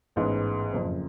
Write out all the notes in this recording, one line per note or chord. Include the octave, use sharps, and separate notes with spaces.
A1 G#2 G#3 B3
F#1 F2 C#3